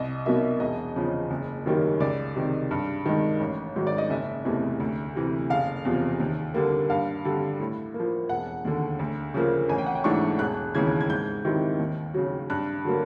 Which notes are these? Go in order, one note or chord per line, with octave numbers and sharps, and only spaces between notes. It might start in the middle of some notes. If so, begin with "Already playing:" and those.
Already playing: C2 D#5
B2 F#3 A#3 D#4 E5
E1 D#5
E2 C#3 F3
F#1
F#2 D#3 G3 A#3
C#2 D5
C3 D#3
G2
D#3 G#3
A1
G#2 D#3 F#3
D5
D#5
F#1 E5
E2 C3 E3 A3
D2
C3 E3
F#1 F5
E2 C3 F3
D#2
D3 G3 A#3
G2 F5
D3 G3
A2
A#3
F3
E1 F#5
D#2 D3
D2
C#3 F3 A#3
A1 G#5
G5
F#5
G5
G#2 E3 A3 D4 C#6
E1 F#6
D#2 C#3 E3 G#6
G#6
G#2 G6
D#3 G3 C4 E4
D#2
C#3 F#3
G2 F#6
D3 F#3 A#3